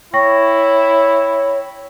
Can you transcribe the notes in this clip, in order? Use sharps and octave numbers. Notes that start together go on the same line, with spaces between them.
E4 C#5 G5 C#6 A#6